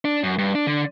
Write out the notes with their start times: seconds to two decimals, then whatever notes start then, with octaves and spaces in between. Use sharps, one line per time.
0.05 D4
0.23 F#2
0.38 G2
0.55 D4
0.67 D3